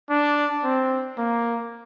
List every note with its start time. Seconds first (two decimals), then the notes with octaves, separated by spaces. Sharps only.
0.10 D4
0.64 C4
1.18 A#3